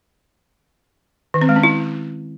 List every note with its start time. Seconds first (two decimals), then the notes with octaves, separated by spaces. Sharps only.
1.34 D#3
1.42 C4
1.49 G#3
1.56 C#4
1.63 E4